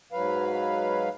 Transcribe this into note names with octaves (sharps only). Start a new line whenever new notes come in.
G#2 F#3 B4 F5